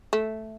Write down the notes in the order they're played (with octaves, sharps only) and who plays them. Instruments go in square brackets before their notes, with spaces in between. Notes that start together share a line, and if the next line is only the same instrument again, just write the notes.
[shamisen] A3